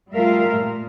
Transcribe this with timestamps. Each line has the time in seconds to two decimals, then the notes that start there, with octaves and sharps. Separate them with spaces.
0.13 G3 A3 F4 A#4 E5 F5
0.54 A#2